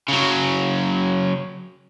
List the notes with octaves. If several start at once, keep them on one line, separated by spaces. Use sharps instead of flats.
C#3 F#3